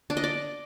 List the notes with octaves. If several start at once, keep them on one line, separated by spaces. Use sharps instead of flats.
D4
D#5
D5